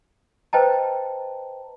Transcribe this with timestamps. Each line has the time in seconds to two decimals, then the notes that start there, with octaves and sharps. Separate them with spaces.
0.53 B4 C5 D#5 G5 A5 A#5